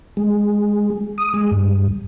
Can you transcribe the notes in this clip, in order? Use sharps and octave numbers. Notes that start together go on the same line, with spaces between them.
G#3
D#6
G#3
G2